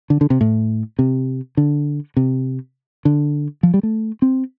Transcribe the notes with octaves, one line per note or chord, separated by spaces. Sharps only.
D3
D3
C3
A2
C3
D3
C3
D3
F3
G3
A3
C4